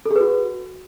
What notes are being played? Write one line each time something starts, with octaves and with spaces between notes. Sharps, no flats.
A4
G#4
B4
F#4